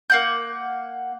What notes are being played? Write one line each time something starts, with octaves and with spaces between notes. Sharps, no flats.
A#3 F#5 G6